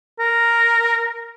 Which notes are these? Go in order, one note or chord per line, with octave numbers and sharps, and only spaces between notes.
A#4